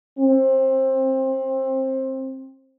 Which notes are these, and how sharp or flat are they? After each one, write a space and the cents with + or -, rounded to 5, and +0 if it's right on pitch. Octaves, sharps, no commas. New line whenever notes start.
C4 +20